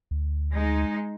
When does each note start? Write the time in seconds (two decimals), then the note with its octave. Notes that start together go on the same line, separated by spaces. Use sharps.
0.11 D2
0.54 G#3 D#4